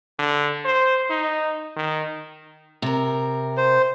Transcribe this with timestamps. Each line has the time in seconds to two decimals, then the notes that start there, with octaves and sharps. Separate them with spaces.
0.19 D3
0.65 C5
1.10 D#4
1.76 D#3
2.82 C3 A#4
3.57 C5